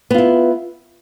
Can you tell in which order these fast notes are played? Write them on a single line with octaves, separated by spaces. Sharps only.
B3 F4 E4